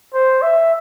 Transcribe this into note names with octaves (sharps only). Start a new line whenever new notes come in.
C5
E5